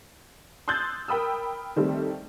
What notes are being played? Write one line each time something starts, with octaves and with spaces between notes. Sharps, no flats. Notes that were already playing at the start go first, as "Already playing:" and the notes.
C6 D#6 E6 F#6 G6 A6
A#4 G5 B5 D#6 E6
D#3 G3 A3 C4